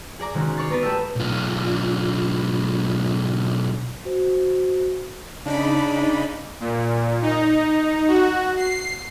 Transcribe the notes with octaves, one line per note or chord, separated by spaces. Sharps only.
G#4 D5 A#5 D6
C3 D#3 G#3 C#4 F#4 G#4
C#5 D5 C#6 A6 C7
B3 A#4 B4
G#3 A3 G4 A5 E6
B1 F4
F#4 C5
C#3 D4 D#4 B5
A#2
D#4
F#4
C7